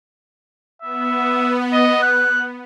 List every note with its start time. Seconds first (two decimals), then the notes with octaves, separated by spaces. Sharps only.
0.82 B3 E5
1.73 D#5
2.02 F#6